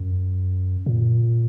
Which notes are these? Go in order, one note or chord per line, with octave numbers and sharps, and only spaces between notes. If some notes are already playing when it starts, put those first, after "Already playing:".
Already playing: F#2
A#2